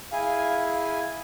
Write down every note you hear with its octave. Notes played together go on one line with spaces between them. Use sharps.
E4 G#4 F5 G#5